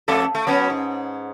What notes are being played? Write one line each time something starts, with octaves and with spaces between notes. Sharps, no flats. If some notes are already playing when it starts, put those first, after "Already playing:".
F2 A3 A4
A3
F#3 B3 C#4
G#2